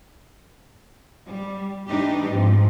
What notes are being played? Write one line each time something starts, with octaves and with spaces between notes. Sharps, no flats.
G3
E3 G3 A3 D4 D#4 G4
G#2 F3 C4